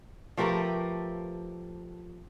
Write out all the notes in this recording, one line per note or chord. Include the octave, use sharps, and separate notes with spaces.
F3 A3 G4 A#4 B4